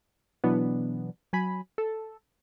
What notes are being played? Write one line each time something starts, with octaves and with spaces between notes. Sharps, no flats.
B2 E3 F#3 B3 D4
F#3 G#5 B5
A4